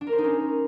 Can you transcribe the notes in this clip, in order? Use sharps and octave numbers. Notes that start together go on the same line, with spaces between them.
D4
A#4
C5
D#4
C#4